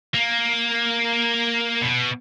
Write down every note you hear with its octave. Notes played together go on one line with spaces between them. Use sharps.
A#3
B2